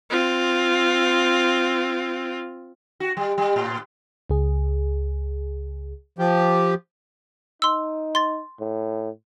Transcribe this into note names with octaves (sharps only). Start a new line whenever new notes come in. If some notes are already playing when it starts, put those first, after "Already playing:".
C4 F4
F#4
G3
G3
A2
C#2 G#4
F3 G4
D#4 C6 E6
C6 A6
A2